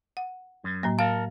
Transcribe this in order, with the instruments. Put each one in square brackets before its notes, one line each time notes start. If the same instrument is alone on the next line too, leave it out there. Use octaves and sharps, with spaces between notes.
[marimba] F#5
[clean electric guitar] F#2
[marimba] A2 F#3 A#3
[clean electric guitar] A#4 A5 [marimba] F5